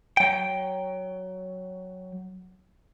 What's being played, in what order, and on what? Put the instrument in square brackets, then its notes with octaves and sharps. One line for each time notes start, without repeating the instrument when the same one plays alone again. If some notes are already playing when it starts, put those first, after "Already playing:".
[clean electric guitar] F#3 G5